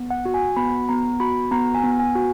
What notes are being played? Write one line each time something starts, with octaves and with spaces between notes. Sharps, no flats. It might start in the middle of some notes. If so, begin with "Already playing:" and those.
Already playing: B3
F#5
F#4
G#5
B3 B5
B3 A#5
F#4 B5
B3 A#5
G#5
B3
G#5
F#4